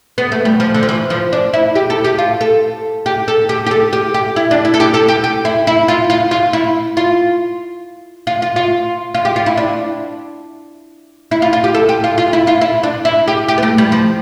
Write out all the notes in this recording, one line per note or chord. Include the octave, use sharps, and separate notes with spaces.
B3
A3
G3
F3
D3
F3
E3
F3
D4
E4
G4
A4
G4
F4
A4
G4
A4
G4
G4
A4
G4
G4
E4
D4
E4
A4
G4
A4
G4
G4
E4
E4
F4
F4
F4
E4
F4
F4
F4
F4
F4
G4
F4
E4
D4
E4
F4
F4
G4
A4
G4
F4
F4
E4
F4
E4
D4
E4
G4
G4
B3
A3
G3
F3